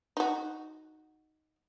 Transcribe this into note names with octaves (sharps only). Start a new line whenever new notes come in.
D#4 F#4